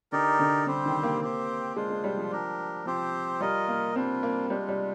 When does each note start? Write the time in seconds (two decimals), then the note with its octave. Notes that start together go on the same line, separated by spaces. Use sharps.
0.12 D3 D#4 G4 A#4 D5
0.39 D3
0.66 D3 G3 C4 G4 C5
0.85 D#3
1.03 A#3
1.21 C4 G4 C5
1.76 G#3 D4 F4 C5
1.90 G#3
2.04 G3
2.17 F3
2.31 D4 G4 A#4
2.86 F3 C4 G4 C5
3.40 G3 F4 A#4 D#5
3.68 A#3
3.96 G3 C4 D4 F4
4.23 A#3
4.50 G3 G#3 D4 F4
4.69 G3